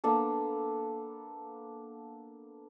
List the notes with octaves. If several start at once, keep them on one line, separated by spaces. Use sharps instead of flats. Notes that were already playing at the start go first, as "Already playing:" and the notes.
A#3 B3 D4 A4